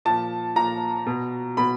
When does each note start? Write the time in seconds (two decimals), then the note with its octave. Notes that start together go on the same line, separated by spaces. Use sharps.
0.05 A#2 F3 A5
0.56 A#2 F3 A#5
1.06 B2
1.57 B2 B5